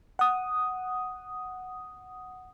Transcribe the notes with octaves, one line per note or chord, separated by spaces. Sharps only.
F#5 D#6